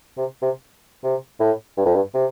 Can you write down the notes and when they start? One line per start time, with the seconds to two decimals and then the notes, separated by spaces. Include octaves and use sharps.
0.17 C3
0.42 C3
1.04 C3
1.40 A2
1.78 G2
1.86 F2
1.95 G2
2.14 C3